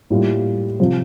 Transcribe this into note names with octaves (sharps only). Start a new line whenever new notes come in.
A2 G3 A#3 F4
C3 F3